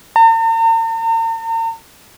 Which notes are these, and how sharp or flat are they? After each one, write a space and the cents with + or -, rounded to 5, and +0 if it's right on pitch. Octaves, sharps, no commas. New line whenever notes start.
A#5 -45